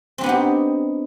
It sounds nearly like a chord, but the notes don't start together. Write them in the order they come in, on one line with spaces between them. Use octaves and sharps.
C4 D4 B3 D#4 G4